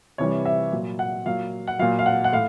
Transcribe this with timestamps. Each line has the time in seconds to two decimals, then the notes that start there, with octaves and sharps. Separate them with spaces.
0.18 C3 E3 G3 C#5
0.45 E5
0.72 A#2 F#3
0.99 F#5
1.26 A#2 F#3 F5
1.67 F#5
1.79 A#2 F#3 F5
1.99 F5
2.06 F#5
2.24 F#5
2.32 A2 F5